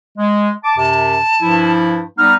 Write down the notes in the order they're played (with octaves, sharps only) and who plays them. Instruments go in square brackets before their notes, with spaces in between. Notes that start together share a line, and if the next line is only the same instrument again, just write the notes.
[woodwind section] G#3
A5 D6
[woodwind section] F#2 C3 [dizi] A5
[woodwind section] G2 F3 E4
[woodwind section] G3 B3 D#4 [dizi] F6